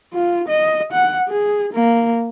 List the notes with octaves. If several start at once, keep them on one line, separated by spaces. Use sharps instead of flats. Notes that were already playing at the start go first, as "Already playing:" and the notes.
F4
D#5
F#5
G#4
A#3